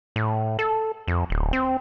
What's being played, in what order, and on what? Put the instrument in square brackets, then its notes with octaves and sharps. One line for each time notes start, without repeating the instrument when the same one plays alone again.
[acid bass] A2
A4
F2
D1
C4